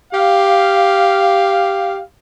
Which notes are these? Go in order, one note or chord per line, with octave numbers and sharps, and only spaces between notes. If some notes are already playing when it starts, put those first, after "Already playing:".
G4 F5